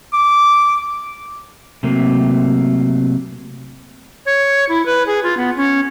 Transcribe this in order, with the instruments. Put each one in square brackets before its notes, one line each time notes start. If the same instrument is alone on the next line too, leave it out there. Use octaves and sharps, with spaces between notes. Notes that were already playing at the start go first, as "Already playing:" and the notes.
[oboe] D6
[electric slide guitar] C3 F#3 A3 A#3
[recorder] C#5
E4
B4
G#4
F4
B3
C#4